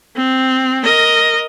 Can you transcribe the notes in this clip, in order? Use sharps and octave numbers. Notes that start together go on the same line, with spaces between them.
C4
A#4 D#5